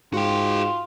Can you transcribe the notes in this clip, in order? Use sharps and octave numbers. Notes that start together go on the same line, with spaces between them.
G#2 F4 F#4 G5